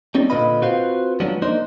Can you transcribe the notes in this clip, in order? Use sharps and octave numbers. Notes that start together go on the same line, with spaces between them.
G3 C4 C#4 D#4 D5
A#2 D3 F4 B4 D#5 B5
C4 F4 F#4 B4 C5 F5
F3 F#3 G#3 B3 D4
A#3 D4 D#4 C5